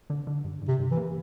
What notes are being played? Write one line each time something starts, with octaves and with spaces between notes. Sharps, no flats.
D3
D3
G2
G2
C3
G2
E3
A#3